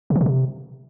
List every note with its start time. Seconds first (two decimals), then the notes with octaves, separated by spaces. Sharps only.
0.10 C3
0.16 D#3
0.21 B2
0.26 C3